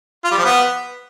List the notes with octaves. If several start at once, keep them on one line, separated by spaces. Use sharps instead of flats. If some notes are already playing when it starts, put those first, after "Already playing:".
F4
G3
F3
B3